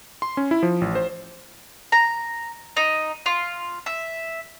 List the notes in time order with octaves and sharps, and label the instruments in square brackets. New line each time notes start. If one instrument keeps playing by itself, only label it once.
[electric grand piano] C6
C#4
E4
F3
A1
C5
[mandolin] A#5
D#4
F4
E5